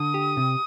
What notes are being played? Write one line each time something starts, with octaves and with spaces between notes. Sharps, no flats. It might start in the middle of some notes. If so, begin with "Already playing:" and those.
Already playing: D3 D#6
G4
C3